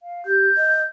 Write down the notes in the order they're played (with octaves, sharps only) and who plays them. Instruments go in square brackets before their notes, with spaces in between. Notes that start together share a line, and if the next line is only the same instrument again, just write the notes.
[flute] F5
[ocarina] G4 [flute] G6
[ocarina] D#5